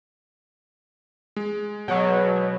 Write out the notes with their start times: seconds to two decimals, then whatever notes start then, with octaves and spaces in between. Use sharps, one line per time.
1.36 G#3
1.88 B2 F#3 C#5